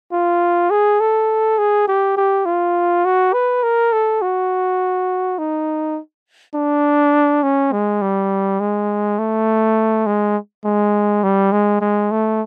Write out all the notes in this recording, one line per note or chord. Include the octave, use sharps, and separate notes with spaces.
F4
G#4
A4
G#4
G4
G4
F4
F#4
B4
A#4
A4
F#4
D#4
D4
C#4
G#3
G3
G#3
A3
G#3
G#3
G3
G#3
G#3
A3